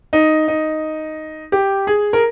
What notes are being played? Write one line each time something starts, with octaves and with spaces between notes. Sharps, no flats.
D#4
D#4
G4
G#4
A#4